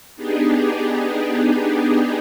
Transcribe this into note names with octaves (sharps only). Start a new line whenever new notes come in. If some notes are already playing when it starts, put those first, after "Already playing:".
B3 D4 D#4 G4 G#4